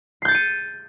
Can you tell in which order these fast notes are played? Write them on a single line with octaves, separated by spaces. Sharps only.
C7 G6 A6 C#7 D#7